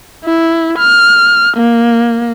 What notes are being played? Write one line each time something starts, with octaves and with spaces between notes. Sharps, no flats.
E4
F6
A#3